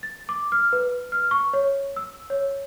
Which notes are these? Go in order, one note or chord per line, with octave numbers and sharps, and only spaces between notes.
A6
D6
F6
B4
F6
C#6
C#5
E6
C#5